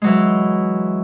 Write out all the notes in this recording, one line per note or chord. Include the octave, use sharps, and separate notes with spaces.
E3 F#3 G#3